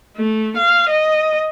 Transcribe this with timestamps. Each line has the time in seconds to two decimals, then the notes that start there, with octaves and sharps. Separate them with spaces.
0.17 A3
0.57 F5
0.89 D#5